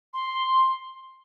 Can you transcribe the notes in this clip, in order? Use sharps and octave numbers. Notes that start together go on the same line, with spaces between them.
C6